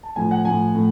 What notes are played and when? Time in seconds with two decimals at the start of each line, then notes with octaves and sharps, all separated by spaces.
0.03 A5
0.16 A2 F3 G#5
0.31 F#5
0.45 A2 F3 G#5
0.75 A2